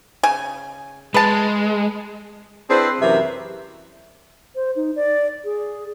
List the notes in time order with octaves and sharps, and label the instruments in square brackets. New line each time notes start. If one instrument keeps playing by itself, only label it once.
[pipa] C#3 G#5
[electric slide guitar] G#3 [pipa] B4 A5
[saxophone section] C4 D4 E4 G#4 B4 C5
F#2 C3 E3 F#3 A#4 E5
[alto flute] C5
D#4
D5
G#4